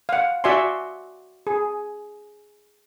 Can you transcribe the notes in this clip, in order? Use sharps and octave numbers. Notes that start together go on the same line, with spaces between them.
F5 F#5
F#4 D5 E5 G#5 C6
G#4